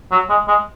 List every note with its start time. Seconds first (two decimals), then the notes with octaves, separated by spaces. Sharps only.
0.12 F#3
0.29 G#3
0.48 G#3